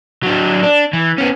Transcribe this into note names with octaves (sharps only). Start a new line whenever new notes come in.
F#3 D4
D4
E3
B3 C#4